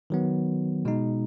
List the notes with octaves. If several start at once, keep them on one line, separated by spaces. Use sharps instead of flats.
D#3 F#3 B3
B2 G#3 D#4